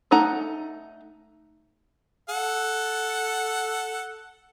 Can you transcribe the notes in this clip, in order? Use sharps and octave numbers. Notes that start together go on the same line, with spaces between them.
A3 D#4 F#5 A#5
A4 F#5